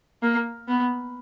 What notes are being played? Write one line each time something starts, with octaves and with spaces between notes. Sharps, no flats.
A#3
B3